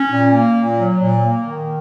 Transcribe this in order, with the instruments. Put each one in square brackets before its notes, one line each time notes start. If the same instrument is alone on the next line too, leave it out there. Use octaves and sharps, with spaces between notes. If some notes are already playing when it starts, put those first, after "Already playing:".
Already playing: [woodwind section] C#4
A#2
A#3
A#2
F#3
A#2
A#3
D#3